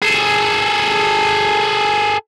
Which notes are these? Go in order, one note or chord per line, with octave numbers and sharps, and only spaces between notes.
G#4 A4